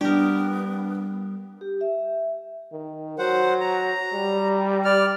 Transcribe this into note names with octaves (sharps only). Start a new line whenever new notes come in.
G3 B3 D4 G4 A#4
G4
E5
D#3
F#3 C5 F#5
A#5
G3
D5 F6